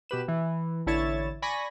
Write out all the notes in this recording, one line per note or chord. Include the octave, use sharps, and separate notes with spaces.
B2 G4 B4 E7
E3
A1 D3 E4 C#5 A6 E7
D5 G#5 B5 C#6 A#6